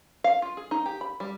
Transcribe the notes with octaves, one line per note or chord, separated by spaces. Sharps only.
F5
F4
G#4
D#4
G4
B5
G3